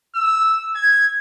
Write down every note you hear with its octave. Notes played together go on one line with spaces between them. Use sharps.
E6
G#6